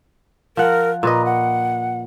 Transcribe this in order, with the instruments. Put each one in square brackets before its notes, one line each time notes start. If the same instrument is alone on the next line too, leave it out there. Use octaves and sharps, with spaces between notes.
[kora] F3 F#5 [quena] A#4
[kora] A#2 B4 D#5 [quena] A#5
[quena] F#5